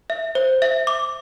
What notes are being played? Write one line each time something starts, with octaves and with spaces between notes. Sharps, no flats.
E5
C5
E5
D6